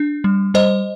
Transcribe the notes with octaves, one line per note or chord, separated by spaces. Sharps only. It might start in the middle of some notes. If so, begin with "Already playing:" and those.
Already playing: D4
G3
G3 C5 D#5